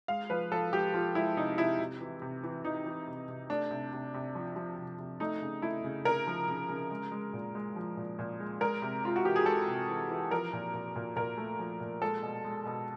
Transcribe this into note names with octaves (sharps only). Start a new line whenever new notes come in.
G#3 F5
F3 B4
F3 A4
G#3 G4
F3 F4
G#3 E4
C3 D#4
C3 E4
C3
E3
C3
E3
E3 D#4
E3
C3
C3
A3 D4
C3
C3
C3
F3
F3
C3
C3
A3 D#4
C#3
A3 E4
C#3
C#3 A#4
F3
C#3
C#3
G#3
G#3
A#2
G#3
F3
A#2
A#2
G#3
G#3 A#4
C3
G#3 F4
F#4
E3 G4
G#4
G#3 A4
C3
E3
E3
F3 A#4
A#2
A#2
A#2
A#2 A#4
A3
F3
A#2
G#3 A4
B2
G#3
B2